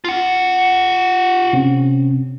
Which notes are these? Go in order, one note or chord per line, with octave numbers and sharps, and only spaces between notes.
F4 F#5
C3 C4 C#4